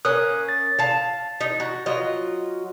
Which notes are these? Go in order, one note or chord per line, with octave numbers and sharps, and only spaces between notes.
A#3 C#4 A#4 D#6 F#6
A6
F5 A5
D#4
F#4
F#3 F4 D#5